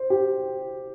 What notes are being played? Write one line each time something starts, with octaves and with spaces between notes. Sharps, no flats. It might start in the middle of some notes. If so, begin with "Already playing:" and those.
Already playing: C5
G4